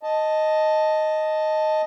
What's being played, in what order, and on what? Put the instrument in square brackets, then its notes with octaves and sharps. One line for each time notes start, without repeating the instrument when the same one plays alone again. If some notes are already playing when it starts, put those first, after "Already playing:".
[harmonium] D#5 A5